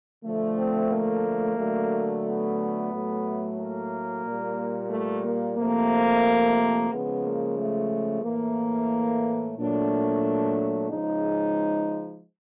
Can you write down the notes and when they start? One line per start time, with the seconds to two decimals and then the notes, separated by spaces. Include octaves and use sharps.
0.25 D3 F3 A3
0.58 C4
0.91 A#3
1.58 D3 F#3 A3
2.24 B3
2.92 A2 F#3 A3
3.57 A#3
4.24 A#2
4.29 G3
4.91 A3
5.24 A#3
5.57 C3 F3 A3 A#3
6.91 C#3 F3 G#3 B3
7.24 A#3
7.57 A3
8.23 A2 E3 A3 A#3
9.57 A#2 F#3 A3 D4
10.90 C#3 F3 G#3 D#4